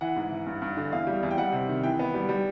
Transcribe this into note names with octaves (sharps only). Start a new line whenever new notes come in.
E3 F#5
G#2
E3
G2
G2
D3
E2 F5
G3
E2
G5
G3 F#5
C3
D#3
E3 G5
B3
G3
G3